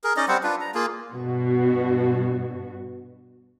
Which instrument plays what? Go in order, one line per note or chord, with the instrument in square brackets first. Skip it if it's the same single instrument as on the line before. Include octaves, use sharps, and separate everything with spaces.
[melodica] G#4 A#4
C#4 D#4 D5 D#5
G3 C4 C5 F#5
D4 F4 B4
A#5
A#3 F4 G#4
[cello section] G2 B2 F#4